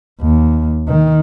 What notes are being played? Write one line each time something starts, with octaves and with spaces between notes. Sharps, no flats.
D#2
D#3